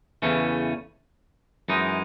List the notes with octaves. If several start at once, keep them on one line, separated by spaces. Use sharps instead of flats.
E2 C#3 E3 A3 C#4
F#2 E3 G#3 D#4